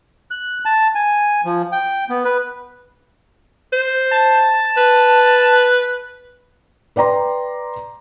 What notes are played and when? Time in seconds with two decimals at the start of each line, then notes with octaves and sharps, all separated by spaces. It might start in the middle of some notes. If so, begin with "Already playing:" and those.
0.31 F#6
0.65 A5
0.95 G#5
1.45 F3
1.72 G5
2.09 B3
2.25 B4
3.72 C5
4.11 A5
4.77 B4
6.96 B4 D5 G5 A#5 C6